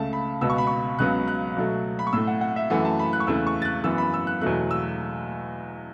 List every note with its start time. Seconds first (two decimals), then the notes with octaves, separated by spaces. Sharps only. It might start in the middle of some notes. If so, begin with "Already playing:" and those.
Already playing: C#2 C#3 A3 A5
0.13 B5
0.41 C#2 B2 B3 E6
0.50 C#6
0.58 B5
0.67 C#6
0.99 C#2 C#3 F#3 B3 F#6
1.28 F#6
1.57 B2 F#3 A3
1.99 B5
2.07 C#6
2.13 A2 A3 E6
2.27 F#5
2.41 F#5
2.56 E5
2.70 F#2 E3 A3 F#5
2.85 A5
2.99 B5
3.13 F#6
3.20 C#6
3.27 E2 C#3 A3 E6
3.47 C#6
3.62 A6
3.65 F#6
3.84 F#2 E3 B3 E6
3.98 B5
4.14 E6
4.27 F#6
4.41 E2 B2 F#3 A3 F#6
4.71 E6